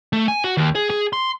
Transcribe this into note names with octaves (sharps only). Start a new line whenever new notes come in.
A3
G#5
F#4
D#2
G#4
G#4
C6